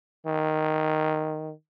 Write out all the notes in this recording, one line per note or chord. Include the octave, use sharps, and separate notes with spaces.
D#3